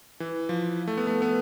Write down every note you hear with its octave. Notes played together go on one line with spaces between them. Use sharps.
E3
F3
A3
B3
A3
B3